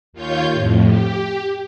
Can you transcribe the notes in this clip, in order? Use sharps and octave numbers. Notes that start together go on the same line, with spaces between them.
D#2 F4 C#5 G6
F2 A2
G4